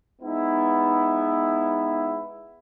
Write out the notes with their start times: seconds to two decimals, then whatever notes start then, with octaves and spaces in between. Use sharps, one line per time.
0.21 G#3 B3 D#4 E4